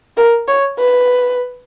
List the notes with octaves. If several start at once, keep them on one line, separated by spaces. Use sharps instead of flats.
A#4
C#5
B4